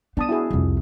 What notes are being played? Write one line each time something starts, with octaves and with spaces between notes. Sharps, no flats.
B3 D4 A5 D#6
E4 F#4 G#4
C2 F2